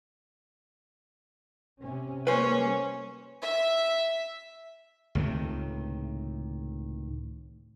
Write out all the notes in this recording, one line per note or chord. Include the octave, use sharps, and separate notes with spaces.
C3 C#4
G3 G#3 A#3 C#4 B4 C5
E5
C#2 A2 C3 D#3